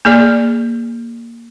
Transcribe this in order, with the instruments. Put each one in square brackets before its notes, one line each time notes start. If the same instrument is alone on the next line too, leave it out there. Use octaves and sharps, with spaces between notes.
[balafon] A#3 G#4 D5